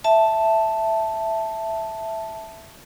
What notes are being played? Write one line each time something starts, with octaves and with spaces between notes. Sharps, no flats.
E5 A5